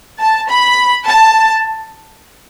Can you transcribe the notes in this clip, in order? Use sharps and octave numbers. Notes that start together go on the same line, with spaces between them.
A5
B5
A5